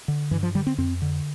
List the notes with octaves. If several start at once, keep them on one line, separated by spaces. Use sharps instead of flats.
D3
G2 E3
F3
D3 G3
C4
F2 C4
D3